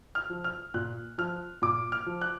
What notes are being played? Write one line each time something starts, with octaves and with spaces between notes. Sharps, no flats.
F6
F3
F6
A#2 F#6
F3 F6
A#2 D6
F6
F3
F#6